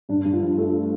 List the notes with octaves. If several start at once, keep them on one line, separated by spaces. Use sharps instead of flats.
G2 D4
G2
F4
F3
A3 A4